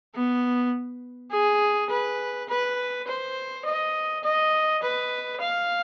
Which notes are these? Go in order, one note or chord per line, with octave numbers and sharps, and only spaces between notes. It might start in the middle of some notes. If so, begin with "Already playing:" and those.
B3
G#4
B4
B4
C5
D#5
D#5
B4
F5